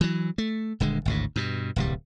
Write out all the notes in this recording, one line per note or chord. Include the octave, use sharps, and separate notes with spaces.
E3 F#3
A3
D#1 D3 G#3
G#1 D2 A2
G2 B2
D1 C2 G3